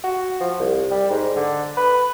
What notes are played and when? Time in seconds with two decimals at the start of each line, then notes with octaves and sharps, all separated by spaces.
0.04 F#4
0.40 F3
0.60 C2
0.91 G3
1.11 G#2
1.36 D3
1.77 B4